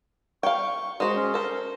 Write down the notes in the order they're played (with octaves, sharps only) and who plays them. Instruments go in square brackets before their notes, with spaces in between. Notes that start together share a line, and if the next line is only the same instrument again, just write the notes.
[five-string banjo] F5 G5 [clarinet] C#6
[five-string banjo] G#3 C5 [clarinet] F#4
[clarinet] C#4
[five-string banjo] A4 C5 [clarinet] A#4